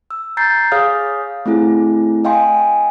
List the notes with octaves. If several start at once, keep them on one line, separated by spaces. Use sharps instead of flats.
E6
A#5 G6 A6 C7
G#4 C#5 F5 D#6 F6
A3 C4 E4 G#4
D#5 F5 G5 G#5 C6